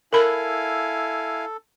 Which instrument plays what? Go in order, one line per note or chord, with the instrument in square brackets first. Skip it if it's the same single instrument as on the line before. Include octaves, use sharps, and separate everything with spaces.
[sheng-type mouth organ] E4 F5 G#5 [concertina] A4 [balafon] A#4 B5